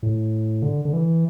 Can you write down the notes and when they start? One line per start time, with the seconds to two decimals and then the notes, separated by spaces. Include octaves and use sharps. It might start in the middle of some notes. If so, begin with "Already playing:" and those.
0.03 A2
0.62 D3
0.85 D3
0.93 E3